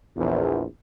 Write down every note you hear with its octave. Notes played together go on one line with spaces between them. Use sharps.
A#1 E2